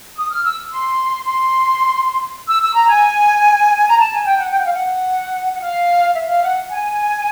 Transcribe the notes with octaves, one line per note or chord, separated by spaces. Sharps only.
D#6
F6
E6
C6
C6
E6
E6
A#5
G#5
A#5
A5
G#5
G5
F#5
G5
F#5
F5
F#5
F#5
F5
E5
F5
F#5
G#5